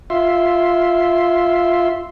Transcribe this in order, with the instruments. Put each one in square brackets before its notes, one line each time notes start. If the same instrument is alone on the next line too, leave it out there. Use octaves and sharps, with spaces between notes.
[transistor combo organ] F4 E5 C6